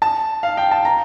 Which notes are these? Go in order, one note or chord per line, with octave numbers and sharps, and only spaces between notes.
A5
F5
G5
A5
A#5